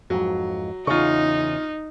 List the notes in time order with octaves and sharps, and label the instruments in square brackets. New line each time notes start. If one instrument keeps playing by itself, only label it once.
[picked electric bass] F2 G#2 [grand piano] F#3
[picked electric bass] E2 C#3 [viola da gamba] D#4 [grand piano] F4 C#6